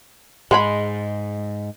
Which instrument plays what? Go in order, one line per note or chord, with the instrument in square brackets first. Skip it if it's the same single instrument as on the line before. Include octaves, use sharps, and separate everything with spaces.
[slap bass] G#2 [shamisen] G#3 F#5 B5